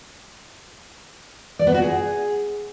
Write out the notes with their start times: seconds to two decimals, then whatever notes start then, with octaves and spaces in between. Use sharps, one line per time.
1.59 D5
1.67 B3
1.74 F#4
1.82 G#4